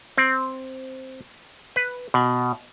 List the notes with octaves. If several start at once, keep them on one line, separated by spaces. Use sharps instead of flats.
C4
B4
B2